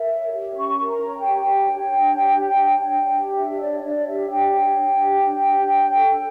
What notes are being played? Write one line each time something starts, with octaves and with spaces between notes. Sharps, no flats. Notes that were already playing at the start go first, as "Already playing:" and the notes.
Already playing: A#4 E5
C#5
G4
C#4 C#6
A#4
A#5
C#5
G5
G4
D4
C#5
D4
G4
D4
C#5
D4
G4
D4 E5
C#5 D5
D4 D5
G4 E5
D4 G5
C#5
D4
G4
D4
C#5
D4
A4